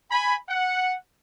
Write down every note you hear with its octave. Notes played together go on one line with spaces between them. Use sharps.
G#5 B5
F#5